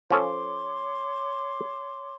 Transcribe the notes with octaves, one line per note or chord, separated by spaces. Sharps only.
F3 C#4 A4 C#5 C6 D6